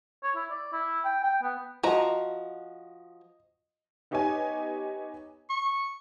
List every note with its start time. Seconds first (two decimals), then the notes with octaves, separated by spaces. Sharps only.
0.23 C#5
0.36 E4
0.51 D5
0.73 E4
1.05 G5
1.23 G5
1.42 B3
1.83 F3 F#4 D#5 A#5
4.11 B3 D#4 G4 C#5 D#5 G#5
5.50 C#6